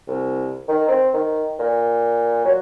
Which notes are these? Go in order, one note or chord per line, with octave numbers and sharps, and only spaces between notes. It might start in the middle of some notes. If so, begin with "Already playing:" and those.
C2
D#3
C4
D#3
A#2
F#3